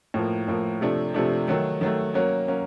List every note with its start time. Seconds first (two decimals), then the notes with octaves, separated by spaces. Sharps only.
0.14 A2 F3 A#3
0.48 A2 F3 A#3
0.81 C3 F3 A3 D4
1.14 C3 F3 A3 D4
1.48 D#3 F#3 A3
1.81 D#3 F#3 A3
2.14 F#3 A#3 C#4
2.48 F#3 A#3 C#4